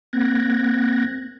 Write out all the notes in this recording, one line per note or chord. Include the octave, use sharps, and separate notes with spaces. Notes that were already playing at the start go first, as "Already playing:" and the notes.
A#3 C4 F#6 G#6 A#6